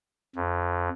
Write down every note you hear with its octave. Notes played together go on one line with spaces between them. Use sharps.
F2